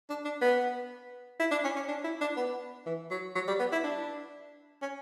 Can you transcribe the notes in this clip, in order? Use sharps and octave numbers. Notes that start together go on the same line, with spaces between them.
D4
D4
B3
E4
D4
C#4
C#4
D4
E4
D4
B3
E3
F#3
F#3
G3
B3
E4
D4
C#4